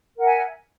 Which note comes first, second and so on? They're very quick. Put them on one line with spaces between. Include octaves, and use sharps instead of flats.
A#4 F#5 E5 G#5